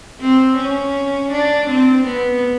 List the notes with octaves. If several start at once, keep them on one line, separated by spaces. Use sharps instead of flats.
C4
C#4
D4
C4
B3